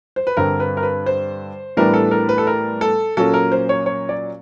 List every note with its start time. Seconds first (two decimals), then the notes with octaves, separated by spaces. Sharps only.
0.16 C5
0.27 B4
0.37 G2 D3 G3 C4 A#4
0.60 B4
0.77 A#4
0.83 B4
1.06 C5
1.77 A2 E3 G3 B3 D4 A#4
1.94 A4
2.11 A#4
2.29 B4
2.38 A4
2.47 A#4
2.81 A4
3.17 A#2 F#3 A#3 C#4 A4
3.34 A#4
3.52 C5
3.69 C#5
3.86 C#5
4.09 D5